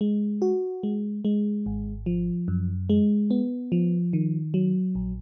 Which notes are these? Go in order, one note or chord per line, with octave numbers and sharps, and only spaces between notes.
G#3
F#4
G#3
G#3
G#1
F3
F#2
G#3
B3
F3
D#3
F#3
A#1